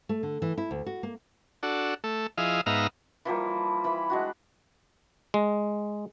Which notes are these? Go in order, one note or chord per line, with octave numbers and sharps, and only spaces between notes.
A3
D3
E3
E4
D2
F#4
A#3
D4 F#4 A4
A3 A4
F3 E4 G#4 D#5 F5
G#2 B3 D#4 E5 F5 A#5
E3 F3 G3 A#3
E3 B5
G#3 D4 F#4
G#3